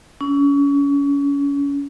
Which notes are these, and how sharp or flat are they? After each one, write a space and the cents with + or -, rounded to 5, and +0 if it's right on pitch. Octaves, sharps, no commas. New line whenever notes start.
C#4 +30